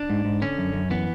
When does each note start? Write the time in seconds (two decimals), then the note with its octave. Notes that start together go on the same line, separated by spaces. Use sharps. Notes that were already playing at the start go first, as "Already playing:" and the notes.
Already playing: D4
0.10 G#2
0.25 G#2
0.42 D3 C#4
0.58 F#2
0.73 F#2
0.90 E3 B3